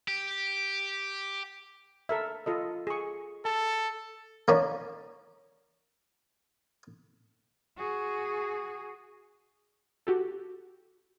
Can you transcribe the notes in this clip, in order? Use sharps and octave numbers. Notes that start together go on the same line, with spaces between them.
G4
A4 A#4 E5
F4 A4 D#5
G#4 C#6
A4 A5
A#3 C#4 D4
F#4 G#4
F#4 G4 A4